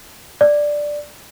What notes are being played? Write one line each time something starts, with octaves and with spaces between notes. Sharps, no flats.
D5